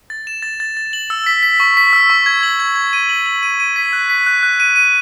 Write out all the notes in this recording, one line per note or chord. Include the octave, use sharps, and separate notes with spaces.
A6
E7
A6
A6
A6
F#7
E6
B6
B6
C#6
B6
E6
C#6
G#6
F#7
G#6
G#6
D#7
F#7
F#7
D#7
D#7
B6
F#6
B6
F#6
F#6
D#7
D#7